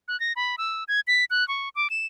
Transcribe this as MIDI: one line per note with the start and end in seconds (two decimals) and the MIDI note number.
0.08 0.19 90
0.20 0.33 94
0.36 0.56 83
0.58 0.84 88
0.88 1.00 92
1.07 1.25 95
1.30 1.46 90
1.48 1.69 85
1.75 1.88 86
1.90 2.06 100